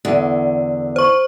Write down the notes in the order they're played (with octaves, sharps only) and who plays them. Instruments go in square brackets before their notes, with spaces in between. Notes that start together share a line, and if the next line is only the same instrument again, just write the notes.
[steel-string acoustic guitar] E2 D3
[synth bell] C5 C#6